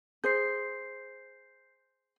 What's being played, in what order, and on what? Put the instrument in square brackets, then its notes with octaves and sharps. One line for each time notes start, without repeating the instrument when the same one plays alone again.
[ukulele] G#4 C5 [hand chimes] G6 C7